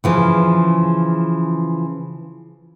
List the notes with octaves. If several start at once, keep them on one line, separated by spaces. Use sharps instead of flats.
C#3 E3 F3